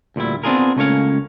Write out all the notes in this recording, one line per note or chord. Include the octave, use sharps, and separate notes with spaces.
D2 A#2 G3 E4
B3 C4 D4 F4 G#4 A#4
C#2 A3 A#3 C#4 C#5 F5